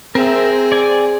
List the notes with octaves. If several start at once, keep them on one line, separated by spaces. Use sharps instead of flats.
C4 G#4 A#4 E5
D5 G#5